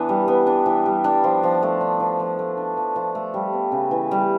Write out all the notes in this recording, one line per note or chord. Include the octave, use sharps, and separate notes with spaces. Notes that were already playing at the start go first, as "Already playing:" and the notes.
Already playing: E3 B3 D4
G3
B3
D4
E3
G3
D4
F3
F3
A3
D4
F3
F3
A3
D4
F3
F3
A3
G3
B3
C#3
E3
G3